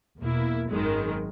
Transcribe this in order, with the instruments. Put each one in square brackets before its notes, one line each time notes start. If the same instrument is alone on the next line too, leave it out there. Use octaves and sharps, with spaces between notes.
[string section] E2 B2 A#3 E4
G#1 F#2 D#3 G#3